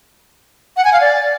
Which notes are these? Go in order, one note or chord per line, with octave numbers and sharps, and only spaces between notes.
F#5
G#5
F5
D5